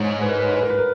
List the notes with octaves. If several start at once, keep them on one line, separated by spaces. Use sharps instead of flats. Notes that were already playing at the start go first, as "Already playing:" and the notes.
Already playing: G#2 C#5
B4
A#4
B4
C#5
B4
A#4
B4
A#4